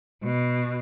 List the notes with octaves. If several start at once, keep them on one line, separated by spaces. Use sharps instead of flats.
B2